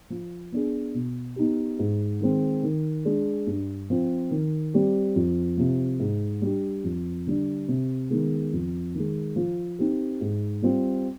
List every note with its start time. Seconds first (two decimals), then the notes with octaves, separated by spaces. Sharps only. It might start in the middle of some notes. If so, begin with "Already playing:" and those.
0.10 F3
0.52 B3 D4 G#4
0.94 B2
1.36 B3 D#4 G4
1.79 G#2
2.20 D#3 G#3 C4
2.63 D#3
3.05 G#3 D4 G#4
3.47 G2
3.90 F3 C4
4.31 D#3
4.74 G3 C4 G4
5.16 F2
5.57 C3 F3
6.00 G#2
6.42 G3 D4 G4
6.84 F2
7.27 D3 G3 D4
7.68 C3
8.10 D#3 G#3 B3
8.53 F2
8.94 D#3
8.99 G#3
9.36 F3
9.79 C4 D#4 G4
10.21 G#2
10.62 G3 C4 F4